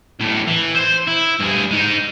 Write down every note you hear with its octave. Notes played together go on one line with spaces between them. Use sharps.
B1 A2
E3
C5 C6
E4
G2 G#4
G#3 D#4